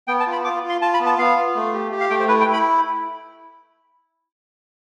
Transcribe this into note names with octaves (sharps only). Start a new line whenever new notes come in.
B3 G5
A5
F4
B5
F4 D6
F4
C6
F4 A5
B5
B3
A5
B3 F5
F4
A3
G4
G4
F5
A3 G5
C5
E4 B4
G5
E4
B5